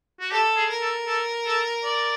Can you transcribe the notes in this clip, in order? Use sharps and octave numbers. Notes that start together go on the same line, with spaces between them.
F#4
G4 A4
G#4
A#4
A4
A4
A4
D5